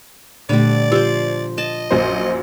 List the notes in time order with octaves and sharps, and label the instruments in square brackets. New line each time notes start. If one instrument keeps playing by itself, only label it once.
[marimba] A#2 A3 [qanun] D3 G3 [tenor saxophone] D5
[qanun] F3 C5 [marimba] G4 E6
[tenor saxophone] D#5 [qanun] A5
[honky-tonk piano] A#1 F#2 C5